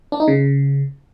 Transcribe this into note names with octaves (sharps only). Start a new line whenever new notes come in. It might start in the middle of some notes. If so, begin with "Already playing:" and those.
D4
D#4
C#3